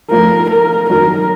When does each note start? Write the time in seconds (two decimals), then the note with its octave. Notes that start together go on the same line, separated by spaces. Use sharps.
0.11 F3 A3 A#4
0.50 A#4
0.90 D#3 F#3 A#4